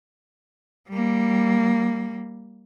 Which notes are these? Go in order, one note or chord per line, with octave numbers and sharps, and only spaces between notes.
G3 A#3